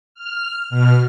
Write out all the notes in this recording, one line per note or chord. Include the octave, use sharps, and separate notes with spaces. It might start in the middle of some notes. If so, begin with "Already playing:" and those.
F6
B2 F6